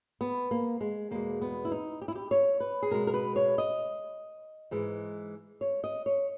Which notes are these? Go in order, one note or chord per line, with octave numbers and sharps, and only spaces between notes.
B3
A#3
G#3
E2 B2 G#3 A#3
B3
E4
D#4
G4
E4
G4
C#5
B4
G#4
B2 G#3 A#4
A#4
B4
C#5
D#5
G#2 E3 G#3
C#5
D#5
C#5